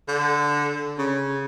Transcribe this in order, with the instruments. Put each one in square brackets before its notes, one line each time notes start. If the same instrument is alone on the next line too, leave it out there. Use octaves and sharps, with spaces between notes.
[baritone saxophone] D3
C#3